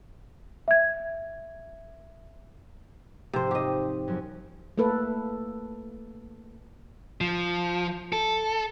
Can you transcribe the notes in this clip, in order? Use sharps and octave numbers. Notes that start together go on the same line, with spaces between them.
E5 G#6
G#2 C3 F3 C5
G4 D#5
F#2 F3
A3 A#3 A4 B4
F3
A4